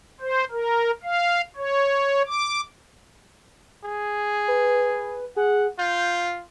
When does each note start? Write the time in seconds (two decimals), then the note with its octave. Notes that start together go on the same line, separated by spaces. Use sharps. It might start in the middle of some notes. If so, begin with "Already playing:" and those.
0.21 C5
0.51 A#4
1.04 F5
1.56 C#5
2.27 D6
3.84 G#4
4.48 B4
5.36 G#4 F#5
5.78 F4 G6